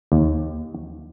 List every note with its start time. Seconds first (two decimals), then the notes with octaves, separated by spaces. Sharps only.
0.12 D#2